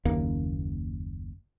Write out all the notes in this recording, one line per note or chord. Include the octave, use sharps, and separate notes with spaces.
F#1 D#2 A#3